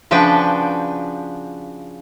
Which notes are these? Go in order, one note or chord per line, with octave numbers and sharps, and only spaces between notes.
C#3 F3 D4 F#4 B4 G5